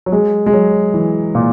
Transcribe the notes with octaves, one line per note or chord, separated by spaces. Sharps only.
F#3
G#3
G#3
F#3
E3
A#2